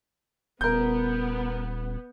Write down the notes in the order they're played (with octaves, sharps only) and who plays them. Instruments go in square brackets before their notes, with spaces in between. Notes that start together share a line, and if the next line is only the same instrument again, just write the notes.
[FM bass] D#1 [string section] B3 [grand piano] A#4 G6